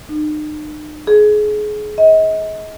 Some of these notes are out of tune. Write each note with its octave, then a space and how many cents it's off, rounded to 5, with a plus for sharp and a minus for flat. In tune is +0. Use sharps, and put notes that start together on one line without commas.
D#4 -40
G#4 +25
D#5 +35